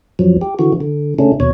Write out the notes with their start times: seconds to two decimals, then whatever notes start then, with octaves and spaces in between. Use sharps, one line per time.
0.19 F#2 F3 F#3
0.41 G4
0.59 D3 E3 F#4
0.80 D3
1.19 C#3 A3 C#4 D4
1.40 D#2 B2 C#5